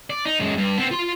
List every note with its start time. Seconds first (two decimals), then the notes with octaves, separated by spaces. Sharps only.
0.10 D5
0.25 D#4
0.39 F#2 G#3
0.57 G2
0.78 B3 C4
0.91 F4 C6